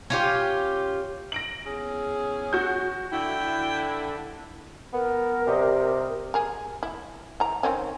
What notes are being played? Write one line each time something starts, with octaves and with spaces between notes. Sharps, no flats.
C#4 F4 G4
A#6 D7 F#7
E2 C#4 G#4
F#4 G6
D3 E4 G5
B3 A#4
C3 G3 G4 D#5
G#4 A#4
E4
E3 A#5
D#3 C4 C#4